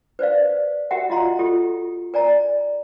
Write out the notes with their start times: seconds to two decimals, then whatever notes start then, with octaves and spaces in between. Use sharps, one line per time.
0.19 B4 C5 D5 F5
0.91 F#4 G4 A#4 E5 F#5 G5
1.10 F4 F#4 D#5 F5 A#5 C6
1.39 F4 G4 A4
2.14 A#4 D5 G#5 A#5